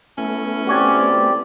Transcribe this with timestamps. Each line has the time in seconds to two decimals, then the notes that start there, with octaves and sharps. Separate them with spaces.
0.18 A3 B3 C#4 E4
0.67 C4 F#4 G4 C#5 D5 G#5